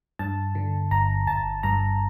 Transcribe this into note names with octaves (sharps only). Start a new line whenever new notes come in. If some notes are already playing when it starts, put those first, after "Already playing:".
G2 A5
D3
G1 A#5
G1 A5
G2 A#5